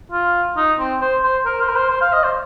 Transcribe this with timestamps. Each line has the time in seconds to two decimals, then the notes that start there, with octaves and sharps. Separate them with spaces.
0.11 F4
0.57 D#4
0.79 C4
1.01 C5
1.23 C5
1.46 A#4
1.61 C5
1.69 A#4
1.76 C5
1.90 C5
2.01 F5
2.13 D#5
2.24 C5